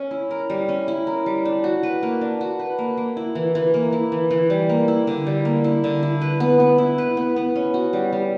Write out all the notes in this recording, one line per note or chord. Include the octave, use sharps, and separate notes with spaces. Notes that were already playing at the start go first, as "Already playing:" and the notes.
Already playing: C#4
E4
A#4
G3
C#4
E4
A#4
G3
D4
F#4
B4
A#3
D4
F#4
B4
A#3
A#3
E4
E3
E3
A#3
E4
E3
E3
G3
A#3
E4
D3
G3
A#3
E4
D3
E4
B4
B3
B3
E4
B4
B3
B3
C#4
F#4
G3
G3